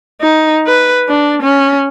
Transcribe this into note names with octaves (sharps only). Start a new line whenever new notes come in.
D#4
B4
D4
C#4